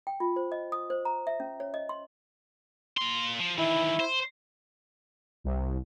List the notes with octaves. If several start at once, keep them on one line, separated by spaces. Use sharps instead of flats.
G5
F4
C5
D#5
D#6
C5
A#5
E5
C#4
C#5
D#5
C6
A#3 C6
F3
D#3 E3 E4
C5
C2